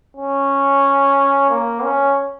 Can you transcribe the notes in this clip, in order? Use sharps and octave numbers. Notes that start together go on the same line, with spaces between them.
C#4
A#3
C#4